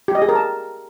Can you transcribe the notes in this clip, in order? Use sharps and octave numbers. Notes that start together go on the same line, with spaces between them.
G4
D#5
G#4
A#4
A5